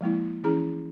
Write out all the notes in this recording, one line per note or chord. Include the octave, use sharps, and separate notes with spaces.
F3 G#3 A#3 E4
E3 C#4 E4 G#4 A#5